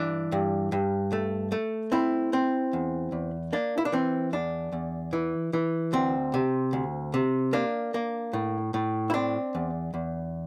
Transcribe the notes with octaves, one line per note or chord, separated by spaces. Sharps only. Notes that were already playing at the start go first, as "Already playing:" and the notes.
Already playing: G2 E3 D4
G2
G2
A3
A3
C4 E4
C4
E2
E2
A#3 D4
E4
D4
E3 C4
E2 D4
E2
E3
E3
D2 C4
C3
D2
C3
A#3 D4
A#3
A2
A2
E4
C4 D4
E2
E2